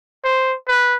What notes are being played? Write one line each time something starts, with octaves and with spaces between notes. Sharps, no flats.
C5
B4